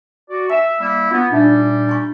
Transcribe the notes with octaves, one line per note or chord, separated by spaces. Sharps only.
F#4 D5
E5 G#5 E6
G3 A#3 E4
B3 F4 C#6
A#2 G3 D4 D#4 E5
E4 G#5 C#6